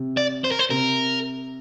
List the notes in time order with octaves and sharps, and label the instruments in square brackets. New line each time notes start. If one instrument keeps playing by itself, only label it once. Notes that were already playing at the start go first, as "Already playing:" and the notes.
Already playing: [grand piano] C3
[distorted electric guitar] D5
C5
A#4
C5
[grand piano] C3 [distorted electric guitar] A#4